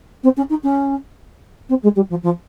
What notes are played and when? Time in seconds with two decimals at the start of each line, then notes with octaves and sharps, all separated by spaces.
0.23 C4
0.37 C#4
0.50 D#4
0.63 C#4
1.69 C4
1.82 G#3
1.96 G3
2.09 F3
2.23 F3